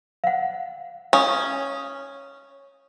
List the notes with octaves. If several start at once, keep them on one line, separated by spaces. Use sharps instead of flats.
F5 F#5
C#4 C#5 F5 D#6